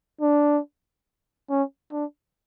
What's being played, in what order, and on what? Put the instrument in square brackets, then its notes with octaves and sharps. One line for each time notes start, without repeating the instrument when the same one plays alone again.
[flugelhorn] D4
C#4
D4